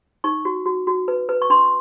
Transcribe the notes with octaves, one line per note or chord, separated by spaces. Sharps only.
D#4 C#6
F#4
F#4
F#4
B4
B4
C#6
D4 C6